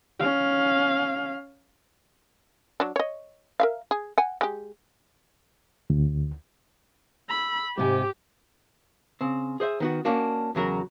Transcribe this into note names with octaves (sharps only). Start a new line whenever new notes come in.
C#4 F5
F#3 D4
C#5 D#5
A#4 E5 F5
G#4
F#5 G#5
G#3 G4
D2
B5 E6
G#2 C3 G4 G#5 D6
C#3 C4
G#4 C5 D#5 E5
D#3 B3 F#4
A#3 C#4 D4 F#4
E2 C#3 F#3 F#4 A#4